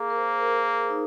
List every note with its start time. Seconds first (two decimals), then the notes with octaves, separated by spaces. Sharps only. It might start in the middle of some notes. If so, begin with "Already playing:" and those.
Already playing: A#3 G#4
0.10 A#4
0.16 C5
0.41 A#4
0.65 G#4
0.90 D#4